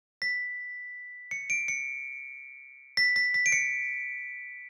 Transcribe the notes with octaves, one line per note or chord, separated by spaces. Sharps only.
B6
C#7
D7
C#7
B6
B6
B6
D7
C#7